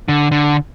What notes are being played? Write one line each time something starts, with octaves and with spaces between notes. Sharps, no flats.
D3
D3